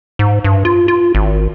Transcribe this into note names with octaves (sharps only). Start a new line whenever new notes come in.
G#2
G2
F4
F4
G#1